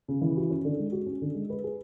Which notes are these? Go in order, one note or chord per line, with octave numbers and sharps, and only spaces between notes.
C#3
E3
F#4
C#4
D3
G#3
F#4
C#4
D3
G#3
B4
G#4